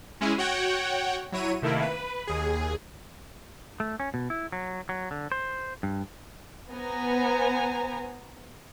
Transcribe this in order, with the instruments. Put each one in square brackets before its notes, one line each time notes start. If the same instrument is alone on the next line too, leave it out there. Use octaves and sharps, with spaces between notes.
[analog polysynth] G#3 C#4 E4 G#4
F#4 C#5 F#5 G5
F#3 E4 C#5 D#7
C3 D#3 A3 A#3 E4
B4
D#2 G#4
[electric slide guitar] A3
C#4
B2
E4
F#3
F#3
D3
C5
G2
[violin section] B3 C5 G#5 A#5